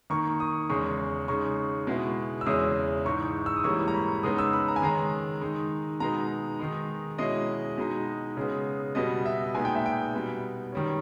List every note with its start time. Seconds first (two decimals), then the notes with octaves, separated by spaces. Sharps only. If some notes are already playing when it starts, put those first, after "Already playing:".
0.10 D#3 A#3 D#4 C#6
0.40 D#6
0.69 E2 C#3 G#3 C#6
1.28 C#3 G#3 D#4 C#6
1.87 B2 G#3 B3 E4
2.41 E6
2.46 E2 C#3 G#3 C#4 E4 D#6
3.05 G#2 E3 G#3 D#4 C#6
3.46 E6
3.56 D#6
3.64 G#2 E3 G3 A#3 C#4 C#6
3.88 A#5
3.94 B5
4.23 C#3 G#3 B3 D#4 D#6
4.38 E6
4.53 B5
4.68 A#5
4.76 G#5
4.82 D#3 G#3 C#4 A#5
5.41 D#3 G#3 D#4
6.00 B2 G#3 B3 D#4 A#5
6.59 D#3 G#3 D#4
7.18 B2 G#3 C#4 E4 D#5
7.78 B2 G#3 D#4
8.37 C#3 G#3 B3
8.95 B2 G3 B3 D#5
9.25 E5
9.54 A#2 G#3 B3 D#4 G#5
9.65 G5
9.75 E5
9.86 G5
10.14 B2 G3 B3
10.72 D#3 G3 C#4